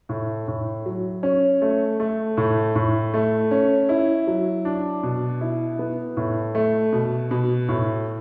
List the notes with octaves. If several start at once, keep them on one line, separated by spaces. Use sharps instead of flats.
A2
A2
F#3
C#4
A3
A3
A2
A2
A3
C#4
E4
F#3
D4
B2
E4
B3
A2
A3
B2
B2
A2